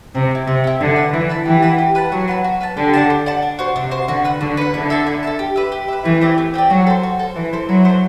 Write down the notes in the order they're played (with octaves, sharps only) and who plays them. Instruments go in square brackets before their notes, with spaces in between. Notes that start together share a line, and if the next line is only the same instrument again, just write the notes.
[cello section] C3 [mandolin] C4
[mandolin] E4 G4
[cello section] C3 [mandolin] C4
[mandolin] E4 G4
[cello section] D3 [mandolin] E4
[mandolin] B4 F#5 A5
[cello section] E3 [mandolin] E4
[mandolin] B4 F#5 A5
[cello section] E3 [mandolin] G4
[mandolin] B4 F#5 A5
G4
B4 F#5 A5
[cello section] F#3 [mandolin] F#4
[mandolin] B4 F#5 A5
F#4
B4 F#5 A5
[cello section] D3 [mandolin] G4
[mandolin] D5 F#5 A5
G4
D5 F#5 A5
D4
F#4 C5
[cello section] C3 [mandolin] D4
[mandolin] F#4 C5
[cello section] D3 [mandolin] F#4
[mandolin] B4 F#5
[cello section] D3 [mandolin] F#4
[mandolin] B4 F#5
[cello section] D3 [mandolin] E4
[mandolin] A4 E5 A5
E4
A4 E5 A5
G4
B4 E5
G4
B4 E5
[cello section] E3 [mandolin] A3
[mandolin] C4 G4 D5
A3
C4 G4 D5
[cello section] F#3 [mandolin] F#4
[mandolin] A4 C5
F#4
A4 C5
[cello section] E3 [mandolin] E4
[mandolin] A4 C5
[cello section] F#3 [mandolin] E4
[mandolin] A4 C5